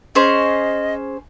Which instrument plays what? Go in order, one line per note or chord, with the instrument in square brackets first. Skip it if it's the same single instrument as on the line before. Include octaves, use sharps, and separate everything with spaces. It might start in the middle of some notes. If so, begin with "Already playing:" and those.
[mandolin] C#4 G#4 C5 [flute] D#5